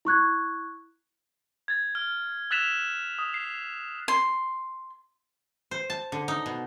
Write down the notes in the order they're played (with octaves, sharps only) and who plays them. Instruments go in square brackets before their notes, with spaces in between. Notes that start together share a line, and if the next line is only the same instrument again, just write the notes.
[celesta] E4 C#6 F#6 G#6
[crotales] G#6 A6
F6
E6 F#6 A6 B6 E7 F7
D#6
C7
[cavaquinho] C6
[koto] C5
A5
D3
D#4
B2